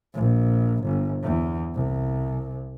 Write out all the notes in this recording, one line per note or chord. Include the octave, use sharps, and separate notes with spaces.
A#1
G1
E2
C2